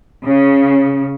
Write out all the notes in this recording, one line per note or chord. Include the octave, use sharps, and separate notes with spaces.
C#3